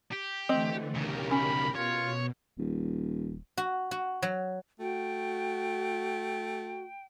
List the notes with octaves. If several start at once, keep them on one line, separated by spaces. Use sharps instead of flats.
G4
D3 E3 A3 C4 D#5
B1 C#3 G4 A#4
C#4 B5
B2 F4 C#5
D#1
F#4
F#4
F#3
A3 F#4 G5